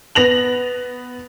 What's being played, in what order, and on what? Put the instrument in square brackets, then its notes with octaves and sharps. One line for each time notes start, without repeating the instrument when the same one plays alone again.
[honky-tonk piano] B3 A#6 F7 F#7